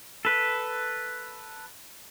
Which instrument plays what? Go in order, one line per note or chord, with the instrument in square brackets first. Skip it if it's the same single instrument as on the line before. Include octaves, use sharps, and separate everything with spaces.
[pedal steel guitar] A4 B4